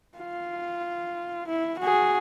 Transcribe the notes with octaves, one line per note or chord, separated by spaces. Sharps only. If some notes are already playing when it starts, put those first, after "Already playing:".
F4
E4
F#4 G#4